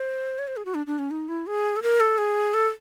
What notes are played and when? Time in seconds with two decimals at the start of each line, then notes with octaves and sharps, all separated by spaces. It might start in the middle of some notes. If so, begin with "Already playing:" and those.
Already playing: C5
0.39 C#5
0.48 C5
0.57 G#4
0.65 F#4
0.75 D4
0.87 D4
0.99 C#4
1.11 D#4
1.28 E4
1.47 G#4
1.76 A4
1.83 A#4
2.00 A4
2.18 G#4
2.54 A4